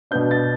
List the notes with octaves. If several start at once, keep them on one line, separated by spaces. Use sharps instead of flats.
B2 B3 D4 G6
A6